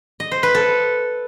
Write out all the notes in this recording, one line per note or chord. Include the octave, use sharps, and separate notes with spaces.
D#5
C5
B4
A4